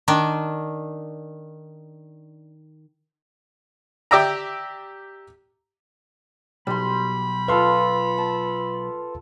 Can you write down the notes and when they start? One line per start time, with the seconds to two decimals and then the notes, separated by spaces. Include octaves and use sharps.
0.08 D#3 D4
4.11 G4 D5 E5 G5 A#5
6.67 B1 G3 B5 C6
7.48 F4 A4 B4 F5 C6
8.18 A5